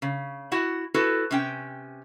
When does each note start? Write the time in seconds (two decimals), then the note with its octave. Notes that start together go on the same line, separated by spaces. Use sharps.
0.02 C#3
0.52 E4 F#4 F#5
0.94 E4 F#4 A4 B4
1.31 C3 C#4 G5